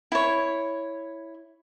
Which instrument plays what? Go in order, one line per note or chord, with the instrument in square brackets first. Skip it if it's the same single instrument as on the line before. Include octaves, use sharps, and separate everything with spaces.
[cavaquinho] E4 C#5